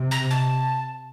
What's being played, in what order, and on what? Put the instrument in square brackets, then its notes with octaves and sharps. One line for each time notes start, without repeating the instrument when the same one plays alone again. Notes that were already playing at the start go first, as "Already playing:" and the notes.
Already playing: [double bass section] C3
[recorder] A#5
A5